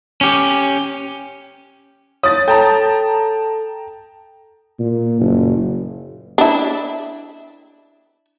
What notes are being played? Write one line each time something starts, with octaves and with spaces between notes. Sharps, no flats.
C#4 G4
C#5 D#6 A6
A4 G5 A5 A#5
A#2
F#1
D4 E4